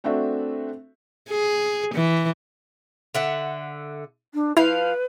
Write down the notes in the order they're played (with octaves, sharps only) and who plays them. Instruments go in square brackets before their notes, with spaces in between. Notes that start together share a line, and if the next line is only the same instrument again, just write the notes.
[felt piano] A3 C4 D4 F#4 E5
[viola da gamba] G#4
E3
[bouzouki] D3 E5 F#5
[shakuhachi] D4
[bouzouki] F3 F5 [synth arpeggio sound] E4 [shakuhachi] B4